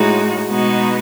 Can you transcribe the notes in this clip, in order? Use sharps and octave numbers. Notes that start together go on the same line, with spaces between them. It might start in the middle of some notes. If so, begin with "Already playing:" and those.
Already playing: A2 G#3 D#4 F#4
B2 G#3 B3 D#4 F#4